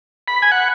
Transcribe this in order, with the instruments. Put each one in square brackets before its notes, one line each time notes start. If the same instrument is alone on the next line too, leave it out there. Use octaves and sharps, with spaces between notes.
[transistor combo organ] B5
G#5
F#5